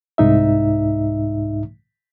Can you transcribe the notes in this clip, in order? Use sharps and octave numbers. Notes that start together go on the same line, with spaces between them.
C2 G#2 D#4 E5